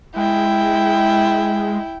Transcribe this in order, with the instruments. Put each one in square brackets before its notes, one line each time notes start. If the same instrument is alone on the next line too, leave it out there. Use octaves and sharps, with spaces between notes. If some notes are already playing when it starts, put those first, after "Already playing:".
[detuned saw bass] G#3 [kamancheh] E4 G5